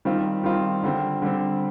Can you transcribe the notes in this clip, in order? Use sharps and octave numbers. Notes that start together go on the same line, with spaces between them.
D#3 G3 C4 F4
D#3 G3 C4 F4
D3 G3 C4
D3 G3 C4